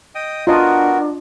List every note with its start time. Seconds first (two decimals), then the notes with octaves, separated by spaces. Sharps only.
0.15 D#5 G5 D#6
0.47 B3 D4 F4 F#4 A#4 D#5 A5